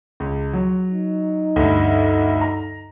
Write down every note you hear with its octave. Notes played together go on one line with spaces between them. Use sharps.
C#2
F#3
D#4
D2 G2
A#5